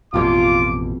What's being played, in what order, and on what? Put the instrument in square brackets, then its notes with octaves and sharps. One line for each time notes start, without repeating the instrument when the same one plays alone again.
[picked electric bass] A1 F2 B2 [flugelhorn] F4 [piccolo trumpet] D6